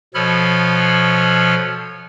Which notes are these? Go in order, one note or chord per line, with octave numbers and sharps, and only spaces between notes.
B2 F3 A4 C#5 B5 F6